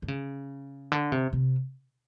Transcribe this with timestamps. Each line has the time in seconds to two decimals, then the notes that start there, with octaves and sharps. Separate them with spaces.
0.02 D3
0.08 C#3
0.92 D3
1.12 C3
1.33 C3